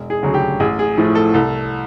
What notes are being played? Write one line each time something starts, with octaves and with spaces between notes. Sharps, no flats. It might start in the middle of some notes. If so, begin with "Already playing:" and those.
Already playing: E1
G#4
D2 C#3 F#3
G4
A1 G#4
G#4
A2 F3 A3
A4
C2 A4